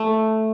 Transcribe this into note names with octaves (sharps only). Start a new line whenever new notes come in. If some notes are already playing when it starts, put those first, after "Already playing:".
Already playing: A3